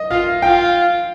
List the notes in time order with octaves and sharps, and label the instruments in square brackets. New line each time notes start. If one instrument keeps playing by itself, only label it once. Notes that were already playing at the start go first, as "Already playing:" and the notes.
Already playing: [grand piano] D#5
[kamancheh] F4 [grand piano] F5
[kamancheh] F4 [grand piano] G5